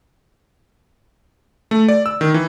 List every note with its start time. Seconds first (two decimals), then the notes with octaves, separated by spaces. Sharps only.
1.71 A3
1.88 D5
2.06 E6
2.21 D#3
2.34 E3